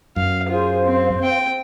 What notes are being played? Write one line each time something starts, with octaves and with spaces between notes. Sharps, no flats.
F#2 F5
F4 G#4 C5 F5
C4
C4 G5